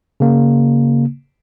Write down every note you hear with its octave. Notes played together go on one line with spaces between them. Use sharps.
C#3 A#3